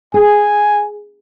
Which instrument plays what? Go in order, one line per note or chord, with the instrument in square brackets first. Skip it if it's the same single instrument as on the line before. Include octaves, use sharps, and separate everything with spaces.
[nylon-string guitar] G#4 [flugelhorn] G#5